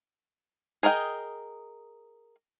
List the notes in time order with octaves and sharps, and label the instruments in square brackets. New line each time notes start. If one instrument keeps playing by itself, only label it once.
[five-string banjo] G#4 A#4 D#5 F#5 G5